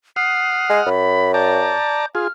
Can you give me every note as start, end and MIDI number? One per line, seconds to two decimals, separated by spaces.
0.16 0.89 78
0.16 0.89 87
0.16 0.89 89
0.16 0.77 96
0.69 0.81 56
0.86 1.75 42
0.86 1.32 83
1.34 2.06 74
1.34 2.06 81
1.34 2.06 82
1.34 2.07 91
2.15 2.27 65
2.15 2.27 68
2.15 2.32 89